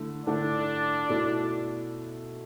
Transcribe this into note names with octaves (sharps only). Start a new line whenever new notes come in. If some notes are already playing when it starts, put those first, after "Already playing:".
Already playing: D3 A3 E4
D3 A3 D4 E4
B2 A3 E4